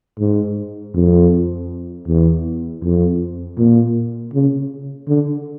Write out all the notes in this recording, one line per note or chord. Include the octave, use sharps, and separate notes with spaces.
G#2
F2
E2
F2
A#2
C#3
D3